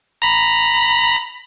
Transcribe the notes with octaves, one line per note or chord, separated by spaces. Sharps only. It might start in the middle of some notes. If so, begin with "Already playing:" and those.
A#5 B5